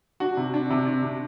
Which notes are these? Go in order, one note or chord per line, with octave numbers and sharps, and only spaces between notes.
D4 F#4
C3
D4
C3
D4
C3